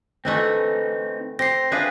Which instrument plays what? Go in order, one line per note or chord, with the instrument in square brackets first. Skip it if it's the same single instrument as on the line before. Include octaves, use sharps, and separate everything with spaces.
[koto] D3 E3 A3 [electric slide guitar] C4 D#4
[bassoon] C4 [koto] G4 [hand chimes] A#6 C7
[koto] D4 G#4 B4 [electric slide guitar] C5 E5 F5